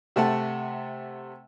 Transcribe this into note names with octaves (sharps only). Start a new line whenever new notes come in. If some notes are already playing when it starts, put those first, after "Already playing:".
C3 A3 F#5 A5